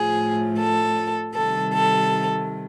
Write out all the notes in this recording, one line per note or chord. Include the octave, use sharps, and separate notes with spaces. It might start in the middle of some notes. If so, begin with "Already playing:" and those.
Already playing: A2 F3 G#4
A4
C3 D#3 G3 A4
A4